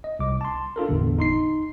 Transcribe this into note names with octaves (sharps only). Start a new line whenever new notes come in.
D#5
C2 D6
A5 C6
D4 F4 A4 A#4
G1 E2 A2 D3
D#4 C6 C7